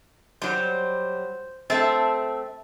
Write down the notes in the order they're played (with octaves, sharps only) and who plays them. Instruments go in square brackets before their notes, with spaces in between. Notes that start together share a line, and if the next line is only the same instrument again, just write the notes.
[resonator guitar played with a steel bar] F#3 G3 [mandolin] C5
[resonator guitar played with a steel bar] A3 C4 [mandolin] E5 A5